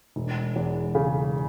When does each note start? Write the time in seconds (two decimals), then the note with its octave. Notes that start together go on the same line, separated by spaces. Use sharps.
0.16 E1
0.56 E2
0.95 C#3